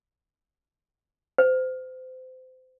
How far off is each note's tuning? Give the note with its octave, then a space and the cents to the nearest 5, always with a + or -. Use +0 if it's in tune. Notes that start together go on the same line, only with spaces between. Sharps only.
C5 -30